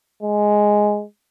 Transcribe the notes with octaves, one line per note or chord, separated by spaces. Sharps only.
G#3